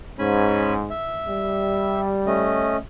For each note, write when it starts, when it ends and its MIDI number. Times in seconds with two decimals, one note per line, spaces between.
0.19 0.90 44
0.19 0.74 61
0.19 0.74 80
0.19 0.74 83
0.90 2.01 76
1.28 2.77 55
2.26 2.77 57
2.26 2.77 61
2.26 2.77 75